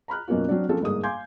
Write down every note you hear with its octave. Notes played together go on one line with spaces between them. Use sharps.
A#5 B5 F6 F#6
F#2 B2 A#3 C#4 F4
F#3 C4 D4
F3 A#3 C4 C#4 A4
G1 G#2 A#3 G#4 D#6
F5 G#5 C6 D6 G6 G#6